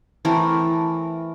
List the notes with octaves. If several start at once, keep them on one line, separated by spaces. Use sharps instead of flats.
E3 A3 C4 A#4